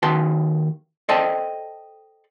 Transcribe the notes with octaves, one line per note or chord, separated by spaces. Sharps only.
D#2 D#3 F#4 B4 A5 C6
A4 C5 D5 D#5 G5 A5